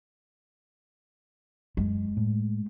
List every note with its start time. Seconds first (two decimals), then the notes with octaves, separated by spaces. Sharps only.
1.77 F#2 G#3
2.17 A2